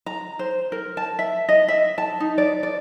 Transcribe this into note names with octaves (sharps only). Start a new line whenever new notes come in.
A#5
C5
A#4
A5
E5
D#5
E5
A5
D#4
D5
D5